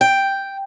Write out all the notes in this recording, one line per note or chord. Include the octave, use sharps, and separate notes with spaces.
G5